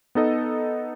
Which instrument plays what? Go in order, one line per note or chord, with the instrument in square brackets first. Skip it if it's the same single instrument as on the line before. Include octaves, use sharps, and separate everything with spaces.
[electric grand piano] B3 D#4 A4 D#5